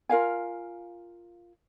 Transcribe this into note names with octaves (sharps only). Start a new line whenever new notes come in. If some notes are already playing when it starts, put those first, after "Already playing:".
F4 A#4 F5 G#5